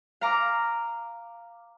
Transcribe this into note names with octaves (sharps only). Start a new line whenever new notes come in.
F5 A#5 D6